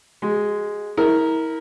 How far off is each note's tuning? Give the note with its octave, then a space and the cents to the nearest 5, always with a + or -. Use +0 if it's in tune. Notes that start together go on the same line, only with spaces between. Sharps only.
G#3 +0 F#4 +40
E4 -30 A#4 +0